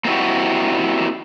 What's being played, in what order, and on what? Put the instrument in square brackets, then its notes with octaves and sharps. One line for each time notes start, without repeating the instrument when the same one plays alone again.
[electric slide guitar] A#3 C4 D#4 E4 F#4 G4